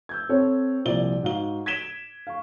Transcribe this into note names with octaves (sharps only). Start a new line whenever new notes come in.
E6 G6 G#6
C4 A4 C#5
C2 A#2 F3 D5 G7
G#2 F#4 F5 G7
G#6 B6 D7 E7 G7
F5 C#6